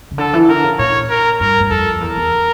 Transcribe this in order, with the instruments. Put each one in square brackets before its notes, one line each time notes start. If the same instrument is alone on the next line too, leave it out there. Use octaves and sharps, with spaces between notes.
[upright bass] C#3
[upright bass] D3 [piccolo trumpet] A4
[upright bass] E3
[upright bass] D3 [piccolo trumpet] A#4
[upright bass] C#3
[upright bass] A#2 [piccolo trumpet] C#5
[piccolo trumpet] A#4
[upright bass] G2 [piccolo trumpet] A#4
[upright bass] G2
[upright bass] F2 [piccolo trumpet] A4
[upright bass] E2 [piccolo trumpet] A#4
[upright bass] E2